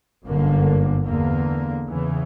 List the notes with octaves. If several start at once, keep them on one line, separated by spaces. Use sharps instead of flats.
G1 F#2 D3 A#3
E2 D3 A#3
E2 C#3 E3